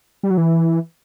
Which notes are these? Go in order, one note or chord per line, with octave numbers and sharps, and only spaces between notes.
G3
F#3
E3